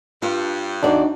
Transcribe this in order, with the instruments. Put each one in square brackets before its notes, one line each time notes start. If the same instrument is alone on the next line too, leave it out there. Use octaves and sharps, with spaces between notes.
[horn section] G2 [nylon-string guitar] F4
[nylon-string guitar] E2 F#4 D5 [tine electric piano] D4 D#4